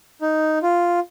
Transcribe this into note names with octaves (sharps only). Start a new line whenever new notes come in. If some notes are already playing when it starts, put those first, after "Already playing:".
D#4
F4